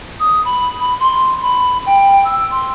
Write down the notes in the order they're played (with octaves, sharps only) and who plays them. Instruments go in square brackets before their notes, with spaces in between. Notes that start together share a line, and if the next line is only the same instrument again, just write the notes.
[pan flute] D#6
B5
B5
C6
B5
G5
E6
C6